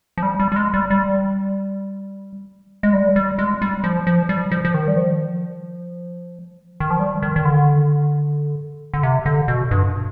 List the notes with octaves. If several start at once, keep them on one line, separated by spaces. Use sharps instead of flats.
F3
G3
G3
G3
G#3
G3
G3
G#3
G3
G3
G#3
G3
F3
F3
G3
F3
F3
D#3
G3
F3
D#3
F3
G3
D#3
D#3
D3
D3
C3
D3
B2
G2